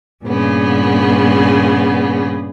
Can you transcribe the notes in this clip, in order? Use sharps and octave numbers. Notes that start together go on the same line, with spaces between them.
G2 A#2 C#3 B3